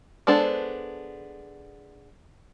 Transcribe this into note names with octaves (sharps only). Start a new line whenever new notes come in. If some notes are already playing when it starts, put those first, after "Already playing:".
G#3 B3 D4 A4 C5